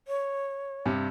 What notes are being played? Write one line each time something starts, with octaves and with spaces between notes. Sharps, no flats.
C#5
G2 C3